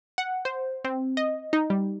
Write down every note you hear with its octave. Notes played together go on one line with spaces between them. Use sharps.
F#5
C5
C4
D#5
D#4
G3